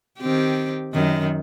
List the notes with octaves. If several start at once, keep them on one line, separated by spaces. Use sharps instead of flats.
D#3 C4 G4
F#2 D#3